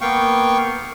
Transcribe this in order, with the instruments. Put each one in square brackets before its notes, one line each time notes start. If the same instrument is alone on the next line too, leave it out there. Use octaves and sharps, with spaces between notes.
[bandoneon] A#3 B3 F5 G5 C#6